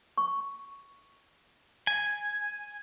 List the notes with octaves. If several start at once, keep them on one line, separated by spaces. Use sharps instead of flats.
C#6
G#5